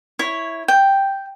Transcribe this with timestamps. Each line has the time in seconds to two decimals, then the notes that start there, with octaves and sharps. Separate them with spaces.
0.19 E4 C#5
0.68 G5